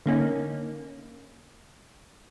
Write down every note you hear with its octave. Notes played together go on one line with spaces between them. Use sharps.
D3 A#3 C#4 D#4